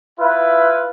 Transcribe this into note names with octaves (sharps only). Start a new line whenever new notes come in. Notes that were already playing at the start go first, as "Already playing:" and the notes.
E4 F4 B4